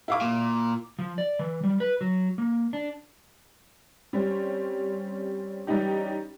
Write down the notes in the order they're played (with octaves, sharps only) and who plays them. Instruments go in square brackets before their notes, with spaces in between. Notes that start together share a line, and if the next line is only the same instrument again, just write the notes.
[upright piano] E4 F5 D6
[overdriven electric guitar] A#2
[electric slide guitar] F3
D5
E3
G3
B4
F#3
A#3
D4
[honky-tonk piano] G3 C4 C#4
E3 G3 C#4 D#4 G4